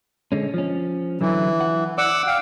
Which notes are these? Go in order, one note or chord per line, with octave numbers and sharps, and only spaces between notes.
D3 G#3 C#4
F3 C#4
D3 E3 F#3
F#5
D5 F#5 D6 E6
F5 G5